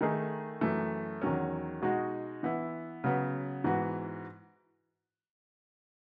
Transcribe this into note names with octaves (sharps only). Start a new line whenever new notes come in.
D#3 A3 D#4 G#4
F#2 E3 A3
E2 D#3 F#3 C#4
B2 G#3 D#4 F#4
E3 B3 E4
C#3 F#3 B3
G#2 E3 B3 F#4